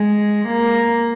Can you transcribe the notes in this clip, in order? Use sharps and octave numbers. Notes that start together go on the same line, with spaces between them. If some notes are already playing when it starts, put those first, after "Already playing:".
Already playing: G#3
A#3